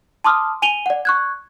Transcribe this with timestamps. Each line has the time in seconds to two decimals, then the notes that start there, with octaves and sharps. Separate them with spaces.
0.24 A5 C6 D6 D#6 F6
0.62 G#5 D#7 F7 G7
0.86 D5 F#5
1.05 C#6 F#6 G#6